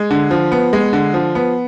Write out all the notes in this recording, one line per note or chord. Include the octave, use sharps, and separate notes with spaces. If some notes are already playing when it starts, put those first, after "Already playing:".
Already playing: G#3
D3
F3
B3
G#3
D3
F3
B3